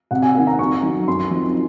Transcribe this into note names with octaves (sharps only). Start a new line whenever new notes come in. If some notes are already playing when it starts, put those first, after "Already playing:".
C3 F#5
G#5
D#3 A#3 C#4 F#5
A#5
F2 C#6
D#3 F#3
F#2 C6
F3 C4 D#4